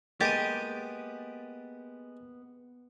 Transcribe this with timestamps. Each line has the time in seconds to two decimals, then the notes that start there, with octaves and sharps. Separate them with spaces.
0.21 G#3 A#3 B3 G4 A6 D7 D#7